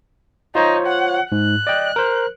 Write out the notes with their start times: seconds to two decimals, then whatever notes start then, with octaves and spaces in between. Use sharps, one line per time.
0.55 D#4 F4 C5 C#5
0.86 F#5
1.32 G#2 F#6
1.67 D5 D#5 G5
1.96 A#4 C5